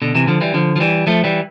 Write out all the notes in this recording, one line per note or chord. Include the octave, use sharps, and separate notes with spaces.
B2 D3
C3 E3
D3 F3
E3 G3
D3 F3
F3
E3 G3
F3 A3
E3 G3